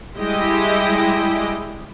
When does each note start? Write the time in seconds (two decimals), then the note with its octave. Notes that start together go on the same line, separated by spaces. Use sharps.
0.16 G3 G#3 E4 G4 D#5